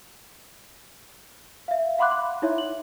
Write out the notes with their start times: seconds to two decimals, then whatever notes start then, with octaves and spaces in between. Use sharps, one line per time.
1.68 E5 F5
1.98 F5 F#5 B5 C6 D6 F#6
2.11 C6
2.42 D#4 E4 C#5 E5
2.58 F#7